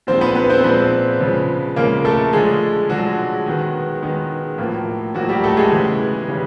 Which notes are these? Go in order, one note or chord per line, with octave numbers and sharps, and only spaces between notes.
A#2 F3 G#3 C4 C5
B3 B4
B3 B4
C4 C5
A#2 F3 G#3 B3 B4
C#3 F3 G#3
C#3 F3 G#3 A#3 A#4
A3 A4
D3 F3 G#3 G#4
D3 F3 F#3 G#3 F#4
D#3 G#3 B3
D#3 G#3 B3
A2 F3 A#3
A2 F3 F#3 A#3 F#4
G3 G4
A3 A4
G#3 G#4
C#3 E3 G3 B3
C#3 E3 G3 B3